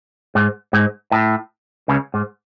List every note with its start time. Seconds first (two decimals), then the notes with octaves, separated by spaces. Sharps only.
0.35 G#2
0.73 G#2
1.11 A2
1.88 C#2 C#3
2.14 G#2